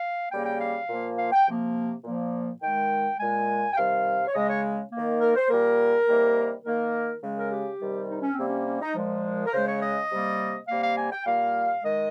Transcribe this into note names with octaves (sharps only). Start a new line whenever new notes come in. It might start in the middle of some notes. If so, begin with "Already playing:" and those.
Already playing: F5
C#3 G3 A#3 G5
G5
F5
A#2 F3 A#3
F5
G5
C3 F3 A#3
A#2 F3 A#3
D#3 G#3 G5
A#2 G#3 G#5
G5
C3 D#3 G3 F5
C#5
C#3 G#3 D#5
C#5
D#3 A#3
A#4
C5
A#2 G3 A#3 A#4
C3 D#3 G3 A#3
D#3 A#3 A#4
C#3 G#3
A#4
G4
C3 D#3 G3
D#4
C#4
C3 G3 A#3 C4
C#4
C#4
D#4
A#2 F3 G#3
A#4
C#3 G#3 C5
C#5
D#5
C3 G3 A#3
C3 G3 A#3 F5
F5
G#5
G5
A#2 G3 A#3 F5
D#3 G#3 D#5